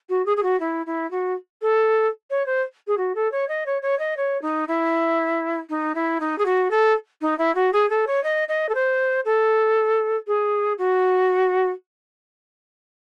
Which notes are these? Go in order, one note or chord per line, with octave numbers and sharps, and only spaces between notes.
F#4
G#4
G#4
F#4
E4
E4
F#4
A4
C#5
C5
G#4
F#4
A4
C#5
D#5
C#5
C#5
D#5
C#5
D#4
E4
D#4
E4
D#4
G#4
F#4
A4
D#4
E4
F#4
G#4
A4
C#5
D#5
D#5
A4
C5
A4
G#4
F#4